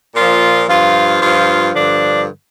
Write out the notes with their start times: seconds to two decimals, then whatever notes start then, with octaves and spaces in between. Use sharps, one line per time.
0.15 A#2 F3 F4
0.68 G2 F3 F4
1.20 G2 F3 F4
1.73 G2 D3 F3 D4